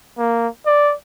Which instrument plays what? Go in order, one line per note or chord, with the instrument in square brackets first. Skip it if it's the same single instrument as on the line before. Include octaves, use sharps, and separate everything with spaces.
[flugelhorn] A#3
D5